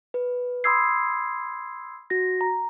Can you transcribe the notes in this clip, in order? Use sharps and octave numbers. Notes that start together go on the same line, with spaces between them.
B4
B5 C6 D#6 E6 G#6 C7
F#4 A#6
A#5